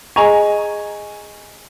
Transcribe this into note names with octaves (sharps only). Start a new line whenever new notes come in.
G#4 D#5 G#5 A#5 C#6